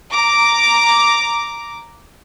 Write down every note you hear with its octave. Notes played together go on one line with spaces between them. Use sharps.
A#5 D6